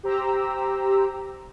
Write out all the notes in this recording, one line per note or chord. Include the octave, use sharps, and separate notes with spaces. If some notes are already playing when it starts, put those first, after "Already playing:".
G4 C5 A#5 E6